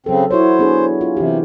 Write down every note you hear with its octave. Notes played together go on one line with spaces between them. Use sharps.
C#3 F#3 C4 A4
E4 F#4 C5 C#5
B3 D4 G#4
F4
C3 E3 G4